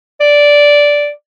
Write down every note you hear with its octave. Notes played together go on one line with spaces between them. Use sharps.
D5